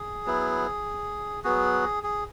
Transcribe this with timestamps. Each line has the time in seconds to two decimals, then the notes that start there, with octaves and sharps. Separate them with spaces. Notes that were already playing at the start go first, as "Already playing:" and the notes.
Already playing: G#4
0.25 F#3 B3 E4
1.44 F#3 B3 F#4 G#4
2.03 G#4